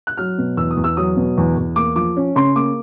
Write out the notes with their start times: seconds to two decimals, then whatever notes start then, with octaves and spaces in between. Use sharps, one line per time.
0.07 F#6
0.17 F#3 F6
0.38 B2
0.57 E2 E6
0.71 D#6
0.77 E2
0.84 E6
0.97 F#3 D#6
1.17 B2
1.38 E2
1.57 E2
1.76 A#3 D6
1.96 F3 D6
2.17 C#4
2.35 C#3 C6
2.55 A#3 D6